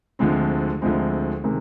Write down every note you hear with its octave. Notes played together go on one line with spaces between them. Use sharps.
D2 D3 F3 G#3 C4
D2 D3 F3 G#3 C4
C3 D#3 G#3